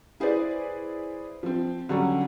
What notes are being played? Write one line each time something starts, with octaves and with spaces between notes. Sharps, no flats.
E4 G#4 B4 C5 D5
F3 C4
D3 F#3 G3 C#4